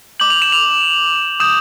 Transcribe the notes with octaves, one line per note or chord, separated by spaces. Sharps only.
D6 G6 F#7
F7
E7
F7
D#6 G6 E7